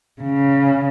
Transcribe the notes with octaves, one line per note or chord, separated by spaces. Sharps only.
C#3